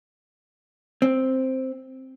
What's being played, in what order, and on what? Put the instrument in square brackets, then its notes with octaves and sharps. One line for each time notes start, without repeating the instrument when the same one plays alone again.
[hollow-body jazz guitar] C4